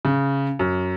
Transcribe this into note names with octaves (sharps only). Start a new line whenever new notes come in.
C#3
F#2